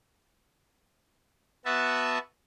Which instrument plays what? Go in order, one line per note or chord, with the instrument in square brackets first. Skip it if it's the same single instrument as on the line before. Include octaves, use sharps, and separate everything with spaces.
[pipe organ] B3 F#4 E5 A5